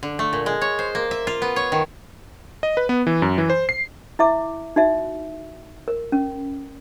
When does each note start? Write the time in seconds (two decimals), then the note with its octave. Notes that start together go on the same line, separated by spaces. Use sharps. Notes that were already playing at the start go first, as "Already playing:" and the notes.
0.03 D3
0.19 A3
0.33 A#2
0.46 G#3
0.61 C#5
0.79 C5
0.95 A#3
1.11 E5
1.27 F4
1.42 B3
1.56 C#5
1.72 D#3
2.63 D#5
2.77 B4
2.89 B3
3.07 E3
3.22 F#2
3.38 E3
3.50 C5
3.69 C7
4.19 E4 E5 D6
4.76 D#4 F#4 E5
5.88 A#4
6.12 C#4